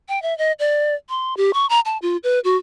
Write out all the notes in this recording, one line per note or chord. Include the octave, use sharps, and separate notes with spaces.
G5
E5
D#5
D5
C6
G4
C#6
A#5
A5
F4
B4
F#4